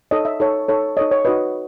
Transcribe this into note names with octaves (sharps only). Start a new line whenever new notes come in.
D#4 A4 C#5 D#5
E5
D#4 A4 C#5
D#4 A4 C#5
D#4 A4 C#5 D#5
C#5
D#4 F#4 B4 D#5